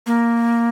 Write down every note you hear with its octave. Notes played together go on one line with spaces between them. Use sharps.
A#3